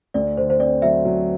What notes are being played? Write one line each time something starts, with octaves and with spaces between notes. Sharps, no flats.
D2 D5
D3 C5
C5
C4 D5
F#3 E5
F#3